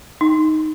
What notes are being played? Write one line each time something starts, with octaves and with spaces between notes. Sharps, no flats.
D#4